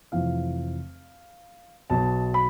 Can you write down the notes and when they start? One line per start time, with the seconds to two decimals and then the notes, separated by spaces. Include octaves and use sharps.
0.12 F1 F2 E3 F5
1.90 B1 B2 A5
2.34 B5